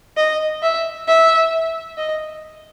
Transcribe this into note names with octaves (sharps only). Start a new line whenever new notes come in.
D#5
E5
E5
D#5